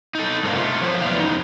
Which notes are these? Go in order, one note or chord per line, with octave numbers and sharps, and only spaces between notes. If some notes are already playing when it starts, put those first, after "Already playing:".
D#4 A4
G#2 D3 A#4 C5 D#5 F5
A3 F4
F3 F#3 C5
E2 A3 B3 E4 D5 F5
F#2 D#4